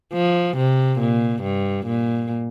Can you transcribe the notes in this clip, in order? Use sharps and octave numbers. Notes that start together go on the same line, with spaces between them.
F3
C3
A#2
G2
A#2